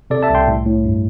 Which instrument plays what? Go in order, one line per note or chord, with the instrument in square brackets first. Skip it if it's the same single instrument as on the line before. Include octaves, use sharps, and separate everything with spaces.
[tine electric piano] C3 A4 D5
E5 A5
C2 G5 C6
A2
A2
G2